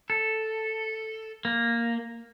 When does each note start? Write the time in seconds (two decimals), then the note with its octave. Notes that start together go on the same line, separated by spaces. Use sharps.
0.10 A4
1.45 A#3